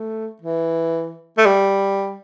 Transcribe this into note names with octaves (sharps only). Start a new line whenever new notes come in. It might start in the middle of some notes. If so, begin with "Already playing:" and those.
Already playing: A3
E3
A3
G3